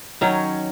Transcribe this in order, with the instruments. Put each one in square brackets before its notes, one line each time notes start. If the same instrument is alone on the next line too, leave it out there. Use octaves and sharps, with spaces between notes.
[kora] D#3 F#3 C#4